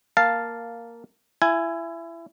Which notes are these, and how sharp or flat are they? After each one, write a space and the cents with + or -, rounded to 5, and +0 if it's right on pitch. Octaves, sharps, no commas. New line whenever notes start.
A#3 +0 F5 +0 A5 +0
E4 +25 G#5 +0